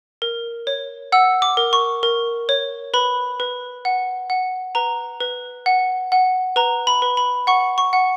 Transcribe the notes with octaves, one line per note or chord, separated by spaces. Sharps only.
A#4
C#5
F#5 E6
D6
A#4
C#6
A#4
C#5
B4 B5
B4
F#5
F#5
B4 A#5
B4
F#5
F#5
B4 A#5
B5
B4
B5
F#5 C#6
C#6
F#5